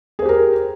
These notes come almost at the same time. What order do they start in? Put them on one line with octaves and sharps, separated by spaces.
G#4 C5 G4 A#4